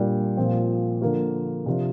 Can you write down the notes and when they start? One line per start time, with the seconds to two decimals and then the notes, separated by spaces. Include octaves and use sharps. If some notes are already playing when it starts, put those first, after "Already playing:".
Already playing: A#2 G3 D4
0.37 A#2 F3 C4
1.02 D3 F3 A#3
1.66 C3 F3 D4 F4